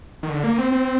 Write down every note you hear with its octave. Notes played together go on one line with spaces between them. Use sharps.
D#3
D3
A#3
C4
C4